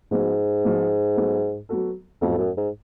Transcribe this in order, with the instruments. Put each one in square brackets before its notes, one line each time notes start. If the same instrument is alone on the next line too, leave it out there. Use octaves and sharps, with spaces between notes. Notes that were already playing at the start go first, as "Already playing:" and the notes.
[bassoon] G#2 [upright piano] F3 B3 F#4
[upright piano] F3 B3 F#4
F#3 B3 F#4 A4
F#3 B3 F#4 A4
[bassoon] F2 [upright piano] A2 F#3 B3 F#4 A4
[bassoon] F#2
G#2